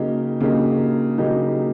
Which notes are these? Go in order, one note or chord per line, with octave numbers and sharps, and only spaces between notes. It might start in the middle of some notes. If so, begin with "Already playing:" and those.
Already playing: C#3 F#3 A#3 D#4 G4
C#3 F#3 A#3 D#4 G4
C#3 F#3 A#3 D#4 G4